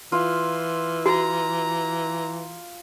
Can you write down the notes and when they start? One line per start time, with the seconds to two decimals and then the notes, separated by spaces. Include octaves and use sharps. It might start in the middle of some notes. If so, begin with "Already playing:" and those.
0.12 E3 F4
1.06 F#4 A#5